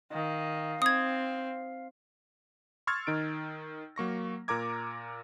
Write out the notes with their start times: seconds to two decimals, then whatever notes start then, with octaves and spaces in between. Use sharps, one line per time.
0.12 D#3 F5
0.82 C4 D#6 G#6
2.87 C6 C#6 E6 F6 G#6 A6
3.07 D#3 D#4 D7
3.96 F#3 A#3 C#6 A#6
4.48 A#2 A#4 A#5 D6 G#6